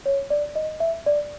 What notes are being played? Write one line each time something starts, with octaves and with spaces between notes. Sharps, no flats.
C#5
D5
D#5
E5
D5